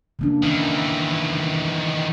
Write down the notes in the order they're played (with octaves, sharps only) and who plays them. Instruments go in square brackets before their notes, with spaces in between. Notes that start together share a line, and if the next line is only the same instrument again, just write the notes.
[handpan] C#3 A#3 D4
[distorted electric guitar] D#3 E3